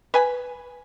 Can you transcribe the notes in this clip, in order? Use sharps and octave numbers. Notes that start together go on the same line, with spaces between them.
B4 G#5 B5